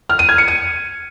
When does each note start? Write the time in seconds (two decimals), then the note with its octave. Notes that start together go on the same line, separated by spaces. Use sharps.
0.09 F6
0.19 D#7
0.29 G#6
0.38 C#7
0.48 D#7